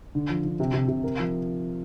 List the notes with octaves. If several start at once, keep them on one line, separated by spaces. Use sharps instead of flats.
D3
F3
D3
C3
C3
C3
A#4
F3